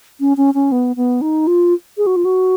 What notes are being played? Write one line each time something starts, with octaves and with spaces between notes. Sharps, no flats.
C#4
C#4
C#4
B3
B3
D#4
F4
G#4
F#4
F4
F#4